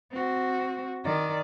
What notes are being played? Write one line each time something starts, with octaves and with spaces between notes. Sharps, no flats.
C4 F#4
D#3 D5